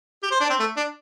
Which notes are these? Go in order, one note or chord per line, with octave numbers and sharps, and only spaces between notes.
G4
C5
D4
C4
A3
D4